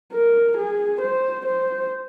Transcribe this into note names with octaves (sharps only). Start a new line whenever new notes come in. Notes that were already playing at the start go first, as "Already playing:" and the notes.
A#4
G#4
C5
C5